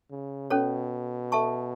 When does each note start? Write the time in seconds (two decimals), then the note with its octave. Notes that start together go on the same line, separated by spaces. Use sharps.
0.10 C#3
0.50 B2 C#4 A4 C#5
1.32 A4 E5 A5 C#6